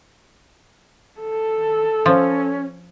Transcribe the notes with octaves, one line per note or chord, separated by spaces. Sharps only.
A4
F3 C#4